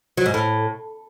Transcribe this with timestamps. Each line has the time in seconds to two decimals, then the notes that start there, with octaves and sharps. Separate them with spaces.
0.17 F#3
0.26 G#2
0.34 A2